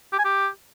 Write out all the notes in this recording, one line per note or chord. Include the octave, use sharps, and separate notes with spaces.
G4
G#5
G4